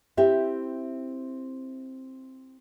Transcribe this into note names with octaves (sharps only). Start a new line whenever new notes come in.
C4 E4 G4 E5